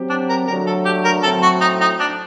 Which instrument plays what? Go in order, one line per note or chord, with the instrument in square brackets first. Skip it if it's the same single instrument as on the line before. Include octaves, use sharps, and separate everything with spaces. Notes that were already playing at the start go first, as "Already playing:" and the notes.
Already playing: [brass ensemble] F#3 C4 G4
[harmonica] D4
A#4
[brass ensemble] D3 F#3 A3 [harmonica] A#4
[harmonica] A4
G4
A#4
[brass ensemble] A2 F#3 C4 [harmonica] A4
[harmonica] F#4
D#4
D#4
D4